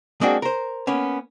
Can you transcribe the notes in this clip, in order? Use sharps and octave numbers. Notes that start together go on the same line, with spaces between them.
G#3 A#3 C4 D4 F#4 G#4
A#4 C5
A#3 B3 C#4